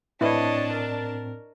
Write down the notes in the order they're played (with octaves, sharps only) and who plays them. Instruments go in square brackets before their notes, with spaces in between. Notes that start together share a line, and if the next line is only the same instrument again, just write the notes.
[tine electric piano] A2 C4 [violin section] D4 A5 [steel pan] E4 B4 [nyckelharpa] C#5 D#5
[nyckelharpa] A#4